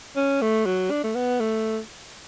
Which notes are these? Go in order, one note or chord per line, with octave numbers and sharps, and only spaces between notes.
C#4
A3
F#3
D4
A3
B3
A3